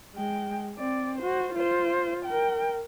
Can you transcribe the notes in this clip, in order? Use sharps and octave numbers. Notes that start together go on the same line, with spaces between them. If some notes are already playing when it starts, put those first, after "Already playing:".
G#3 G5
C4 D5
F#4 C5
F4 C5
A#4 G5